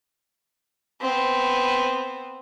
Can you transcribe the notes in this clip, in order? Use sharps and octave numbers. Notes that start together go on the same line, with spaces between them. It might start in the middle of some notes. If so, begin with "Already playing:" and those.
B3 C4